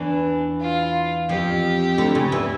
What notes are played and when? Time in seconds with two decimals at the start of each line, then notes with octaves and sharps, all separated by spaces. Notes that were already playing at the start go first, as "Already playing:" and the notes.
Already playing: E2 E3 D4
0.61 F4
1.29 F2 F3 G4
1.98 D2 D3
2.15 C#3
2.32 E2 E3